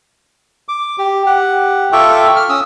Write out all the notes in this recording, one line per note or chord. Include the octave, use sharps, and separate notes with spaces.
D6
G4
G4 F#5
F4 A4 E5 G5 C#6 D6
F6
C#4 D#6 E6